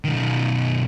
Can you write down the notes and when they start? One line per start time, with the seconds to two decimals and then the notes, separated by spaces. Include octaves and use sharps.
0.05 B1 D#3